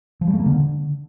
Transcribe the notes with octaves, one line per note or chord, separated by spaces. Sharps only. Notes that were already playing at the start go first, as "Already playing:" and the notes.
F3
G3
A3
A#3
D3